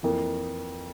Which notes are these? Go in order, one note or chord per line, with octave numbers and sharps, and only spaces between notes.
F2 E3 A#3